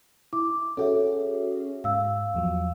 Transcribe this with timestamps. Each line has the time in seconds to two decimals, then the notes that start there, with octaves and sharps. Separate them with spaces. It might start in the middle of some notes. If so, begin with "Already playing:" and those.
0.33 E4 D6
0.77 C#4 F#4 G#4 A4 C#5 E5
1.84 G#2 F5 E6
2.34 E2 F3 F#3